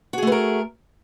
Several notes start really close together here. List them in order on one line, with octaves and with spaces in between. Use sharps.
F#4 G#4 A3 B4 A#4